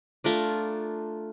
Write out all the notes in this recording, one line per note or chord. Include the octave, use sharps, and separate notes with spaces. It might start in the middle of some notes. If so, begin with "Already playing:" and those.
A3 D4 F4 A#4